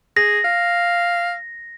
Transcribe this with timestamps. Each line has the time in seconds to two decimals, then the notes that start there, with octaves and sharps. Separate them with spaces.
0.17 G#4 A#6
0.45 F5